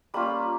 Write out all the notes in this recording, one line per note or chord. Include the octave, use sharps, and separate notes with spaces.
G3 A#3 C#4 F4 B5